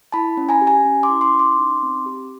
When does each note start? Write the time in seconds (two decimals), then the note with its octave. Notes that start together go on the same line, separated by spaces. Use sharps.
0.12 E4 A5 B5
0.37 C#4
0.49 G#5 A#5
0.61 G4
0.67 G#5 A#5
0.85 C#4
1.03 C6 D6
1.09 E4
1.21 C6 D6
1.34 C#4
1.39 C6 D6
1.58 D#4
1.83 C4
2.06 G4